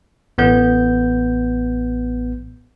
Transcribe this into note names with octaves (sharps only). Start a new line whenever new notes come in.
A1 B3 G6